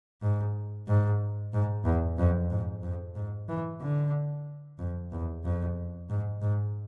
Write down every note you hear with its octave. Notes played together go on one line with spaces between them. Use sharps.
G#2
G#2
G#2
E2
F2
G#2
F2
G#2
E3
D3
F2
E2
F2
G#2
G#2